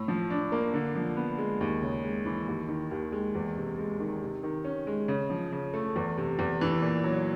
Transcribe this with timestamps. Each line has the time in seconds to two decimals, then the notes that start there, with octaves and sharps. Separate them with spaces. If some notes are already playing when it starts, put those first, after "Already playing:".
Already playing: A2
0.08 F3
0.30 D4
0.52 A#3
0.74 D3
0.95 F3
1.16 B3
1.38 G#3
1.61 D#2
1.83 C#3
2.03 G#3
2.25 E3
2.48 D#2
2.68 D#3
2.91 D#2
3.12 G#3
3.35 E2
3.57 C3
3.78 G#3
4.00 D#3
4.22 C3
4.43 D#3
4.64 C#4
4.87 G#3
5.08 C#3
5.30 F3
5.52 C#3
5.74 A3
5.96 E2
6.17 C3
6.39 E2
6.61 E3
6.82 A#2
7.04 F#3